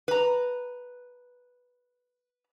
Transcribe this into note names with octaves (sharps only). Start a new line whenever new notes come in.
B4 A#5